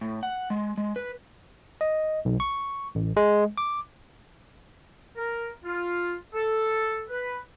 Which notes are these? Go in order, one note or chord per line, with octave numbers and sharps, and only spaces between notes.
A2
F#5
G#3
G#3
B4
D#5
B1
C#6
A1
G#3
D6
A#4
F4
A4
B4